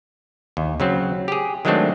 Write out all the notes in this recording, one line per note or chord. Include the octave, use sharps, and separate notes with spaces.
D#2
C#3 F#3 C4
G4 G#4
D#3 F#3 G#3 A3 C4 D4